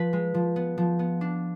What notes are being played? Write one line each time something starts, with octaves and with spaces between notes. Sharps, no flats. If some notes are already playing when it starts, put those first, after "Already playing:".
Already playing: F3 B4
G#3
F3
B3
F3
B3
D4